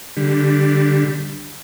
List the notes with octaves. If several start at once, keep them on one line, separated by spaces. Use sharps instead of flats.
D3 G3